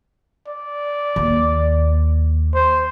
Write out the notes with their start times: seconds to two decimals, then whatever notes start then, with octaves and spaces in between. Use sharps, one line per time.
0.48 D5
1.16 D#2
2.54 C5